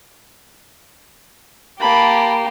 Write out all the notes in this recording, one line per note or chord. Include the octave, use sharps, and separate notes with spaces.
A#3 G4 A5 B5